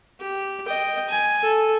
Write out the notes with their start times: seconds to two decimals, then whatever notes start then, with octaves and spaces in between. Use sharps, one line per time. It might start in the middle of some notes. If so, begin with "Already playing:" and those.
0.21 G4
0.67 D#5 G5
1.09 G#5
1.43 A4